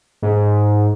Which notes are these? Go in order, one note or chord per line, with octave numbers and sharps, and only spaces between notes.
G#2